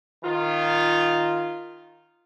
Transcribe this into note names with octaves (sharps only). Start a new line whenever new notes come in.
D#3 F4